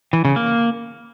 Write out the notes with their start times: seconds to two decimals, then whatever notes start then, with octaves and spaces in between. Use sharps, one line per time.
0.13 E3
0.25 C#3
0.36 A#3